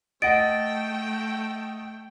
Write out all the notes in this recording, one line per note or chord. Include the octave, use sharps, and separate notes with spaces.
A3 D#5 F#5 G5 A6 D7